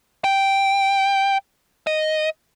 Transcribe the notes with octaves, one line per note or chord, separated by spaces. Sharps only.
G5
D#5